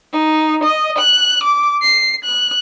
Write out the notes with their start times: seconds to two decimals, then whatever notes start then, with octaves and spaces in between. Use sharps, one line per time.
0.13 D#4
0.63 D#5
0.98 F#6
1.43 D6
1.82 C7
2.24 F#6